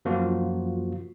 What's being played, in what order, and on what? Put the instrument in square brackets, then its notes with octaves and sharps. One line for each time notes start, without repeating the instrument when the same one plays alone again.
[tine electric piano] F#2 F3 A#3 F4 F#4